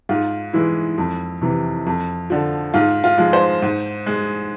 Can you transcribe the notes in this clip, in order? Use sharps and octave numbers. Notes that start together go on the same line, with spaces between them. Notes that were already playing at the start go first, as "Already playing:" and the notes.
G#2 F4
E3 G#3 E4
F2
C3 E3
F2
D3 F3
G#2 F4
F4
F3 G#3
C5
G#2
G#3